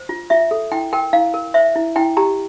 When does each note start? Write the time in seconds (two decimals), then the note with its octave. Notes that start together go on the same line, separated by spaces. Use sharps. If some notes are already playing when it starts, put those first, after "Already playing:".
Already playing: C5
0.09 F4
0.30 F4 E5
0.51 A4
0.72 E4 G5
0.93 A#4 G5
1.13 E4 F5
1.34 A#4
1.54 C5 E5
1.76 E4
1.96 E4 G5
2.17 G4 A#5